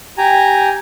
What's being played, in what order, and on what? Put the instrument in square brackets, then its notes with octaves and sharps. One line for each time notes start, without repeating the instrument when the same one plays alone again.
[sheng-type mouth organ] G4 G#5 A#5